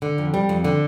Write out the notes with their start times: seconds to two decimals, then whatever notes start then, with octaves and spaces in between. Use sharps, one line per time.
0.02 D3
0.18 F2
0.34 G3
0.49 F2
0.64 D3